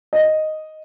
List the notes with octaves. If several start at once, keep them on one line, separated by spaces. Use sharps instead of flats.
D#5